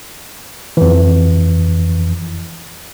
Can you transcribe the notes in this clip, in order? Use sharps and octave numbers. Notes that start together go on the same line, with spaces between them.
F2 E3